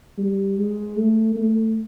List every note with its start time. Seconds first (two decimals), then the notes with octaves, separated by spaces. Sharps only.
0.18 G3
0.58 G#3
0.97 A3
1.36 A3